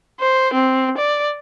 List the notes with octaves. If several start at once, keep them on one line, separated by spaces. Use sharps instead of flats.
C5
C4
D5